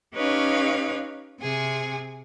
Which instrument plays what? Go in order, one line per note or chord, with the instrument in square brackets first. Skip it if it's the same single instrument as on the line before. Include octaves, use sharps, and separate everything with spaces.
[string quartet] C#4 D#4 G4 B4 C#5 F5
C3 G#4 G#5